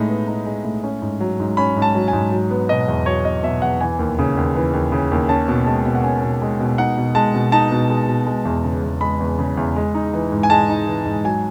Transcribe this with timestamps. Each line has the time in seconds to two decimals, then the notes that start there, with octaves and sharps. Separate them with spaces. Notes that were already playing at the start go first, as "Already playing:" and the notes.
Already playing: A2 G#3 D#4
0.09 B3
0.27 D#4
0.46 G#3
0.64 A2
0.84 C#4
1.02 G#2
1.20 F#3
1.40 G#2
1.57 C#4 B5
1.76 G#2
1.82 A5
1.95 F#3
2.08 G#5
2.13 G#2
2.32 F#3
2.51 B3
2.69 B2 D#5
2.88 E2
3.06 F#3 C#5
3.25 B3 D#5
3.43 B2 E5
3.62 E2 F#5
3.81 E3 G#5
3.99 D#2
4.19 C#3
4.37 D#2
4.55 E3
4.73 D#2
4.92 C#3
5.12 D#2
5.29 C#4 A5
5.48 B2
5.66 G#3 A5
5.85 B2
5.95 F#5
6.04 C#4 G#5
6.23 B2
6.42 G#3
6.60 B2
6.78 D#4 F#5
6.98 B2
7.15 G#3 A5
7.34 B2
7.52 D#4 A5
7.71 B2
7.90 G#3
8.09 B2
8.26 G#3
8.45 E2
8.64 C#3
8.83 E2
9.01 G#3 B5
9.20 E2
9.39 C#3
9.57 E2
9.76 G#3
9.95 D#4
10.14 E3
10.32 G#2
10.43 G#5
10.50 G#3 A5
10.69 D#4
10.87 E3
11.06 G#2
11.24 F#3 G#5